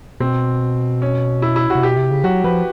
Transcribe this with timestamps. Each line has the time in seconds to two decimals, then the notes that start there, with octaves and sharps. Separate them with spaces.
0.20 B2 C4
1.02 C#4
1.42 E4
1.56 E4
1.70 F#4
1.75 C3
1.83 B2 G4
1.97 C3
2.11 C#3
2.24 F#3 F#4
2.44 F3 B4